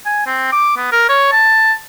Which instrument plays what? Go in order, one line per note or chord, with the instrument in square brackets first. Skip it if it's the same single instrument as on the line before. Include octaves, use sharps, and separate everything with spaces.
[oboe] G#5
C4
D6
B3
A#4
C#5
A5